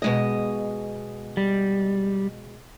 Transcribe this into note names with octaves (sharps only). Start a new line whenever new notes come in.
B2 G#3 D#5
G3